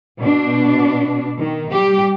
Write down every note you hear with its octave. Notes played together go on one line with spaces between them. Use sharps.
B2 D4
D#3
G3 G4